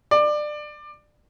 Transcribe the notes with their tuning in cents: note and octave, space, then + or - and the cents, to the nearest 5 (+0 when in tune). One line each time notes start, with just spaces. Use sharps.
D5 +25